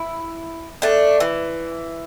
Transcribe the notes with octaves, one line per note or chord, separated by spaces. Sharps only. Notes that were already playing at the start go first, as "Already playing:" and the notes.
Already playing: E4
A3 D4
E3